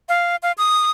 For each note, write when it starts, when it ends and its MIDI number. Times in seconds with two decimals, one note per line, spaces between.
0.09 0.36 77
0.43 0.52 77
0.58 0.91 87